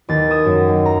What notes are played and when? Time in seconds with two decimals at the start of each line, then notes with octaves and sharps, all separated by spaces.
0.09 D#2 A6
0.31 D#6 G#6 E7
0.45 F#2
0.68 D#2
0.85 A#5